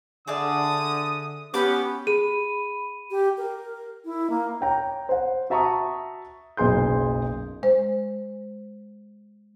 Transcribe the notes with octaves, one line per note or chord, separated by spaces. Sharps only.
D3 G#4 D5 E5 D#6
B3 C#4 G4 B5 D6
G#4 B5 D#7
G4
A#4
E4
A#3
C#5 G5 A#5
C5 F#5
F#4 E5 A5 A#5 C#6 D#6
F#1 B1 G#4 C6 G6
G#3 C5